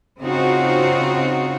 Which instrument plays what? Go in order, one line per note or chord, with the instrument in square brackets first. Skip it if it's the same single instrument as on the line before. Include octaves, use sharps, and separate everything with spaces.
[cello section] C#3 C4 D#4 F4 F#4